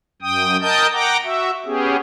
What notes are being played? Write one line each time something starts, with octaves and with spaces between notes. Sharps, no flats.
F#2 G5 D#6
A#4 D#5 G5 A5 D#6 G6
F#5 G5 A#5 D6
F#4 E5
B3 C#4 G4 G#4